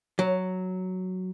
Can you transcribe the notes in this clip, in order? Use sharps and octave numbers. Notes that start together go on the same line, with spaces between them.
F#3